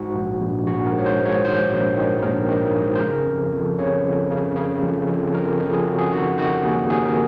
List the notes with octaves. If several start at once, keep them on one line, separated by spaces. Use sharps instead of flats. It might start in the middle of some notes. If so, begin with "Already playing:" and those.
Already playing: G#2 F#4
A#1
A#1
A#1 F#4
A#4
G#2
C#5
C5
G#2
C#5
D#3 C5
A#1
D#3
A#1 A#4
D#3
G#2
C5
C#3 A#4
F2
F2
C#3 C#5
F2
C#3
C#3
F2
F2
F2 A#4
F2
G#4
C#3 F#4
G#4
D#3 F#4
D#3 F#4
D#2 G#4
D#2 G#4
A#4